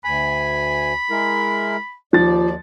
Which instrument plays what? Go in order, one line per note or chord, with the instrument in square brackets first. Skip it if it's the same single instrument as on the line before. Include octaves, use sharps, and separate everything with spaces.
[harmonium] D2 G#5 [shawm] B5
[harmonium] G#3 E4 A#4
[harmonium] D#2 D5 [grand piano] F3 A6